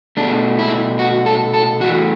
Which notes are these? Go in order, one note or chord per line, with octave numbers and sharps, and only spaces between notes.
B2 A3 D4
E4
F#4
A4
A4
E2 E3 A3 F#4